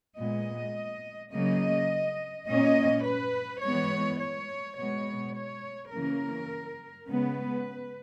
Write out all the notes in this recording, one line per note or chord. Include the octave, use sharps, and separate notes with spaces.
A#2 G#3 B3 D#5
C#3 F#3 A#3 D#5
A#2 A#3 C#4 D#5
B4
E3 G#3 B3 C#5
C#5
B2 G#3 B3 C#5
C#5
C#3 E3 A#3 C#4 A#4
C#3 G#3 B3 B4